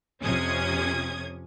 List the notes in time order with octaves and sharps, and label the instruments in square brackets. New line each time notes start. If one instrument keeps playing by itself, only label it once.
[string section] F2 C3 C#4 D#6 G#6